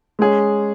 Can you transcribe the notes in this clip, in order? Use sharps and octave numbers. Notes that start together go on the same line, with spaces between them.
G#3 C#4 G#4